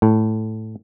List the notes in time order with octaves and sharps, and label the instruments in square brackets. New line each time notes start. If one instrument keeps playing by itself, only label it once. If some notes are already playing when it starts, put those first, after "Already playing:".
[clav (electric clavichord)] A2